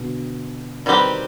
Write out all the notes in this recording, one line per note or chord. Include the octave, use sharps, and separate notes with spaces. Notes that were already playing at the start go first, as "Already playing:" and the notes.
Already playing: B2 D3
D#3 G3 C4 G4 B4